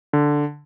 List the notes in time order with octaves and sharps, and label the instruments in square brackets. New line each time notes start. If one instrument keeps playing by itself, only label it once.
[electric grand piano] D3